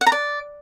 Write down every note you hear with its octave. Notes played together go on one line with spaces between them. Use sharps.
F#5
A#5
D5